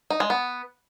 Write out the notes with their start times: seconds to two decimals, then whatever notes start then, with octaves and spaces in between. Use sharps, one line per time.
0.10 D#4
0.20 G#3
0.30 B3